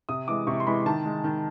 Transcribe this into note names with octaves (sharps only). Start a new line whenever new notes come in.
C3 D#6
E3 G#3 D6
C3 C#6
C6
E3 G#3 B5
D#3 A5
G#3
D#3